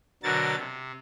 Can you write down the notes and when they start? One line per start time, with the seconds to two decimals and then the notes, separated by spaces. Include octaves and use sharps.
0.23 B2 D3 F#3 F#4 A#4 A6
0.57 C3